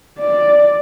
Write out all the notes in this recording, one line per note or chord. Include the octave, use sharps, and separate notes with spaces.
D5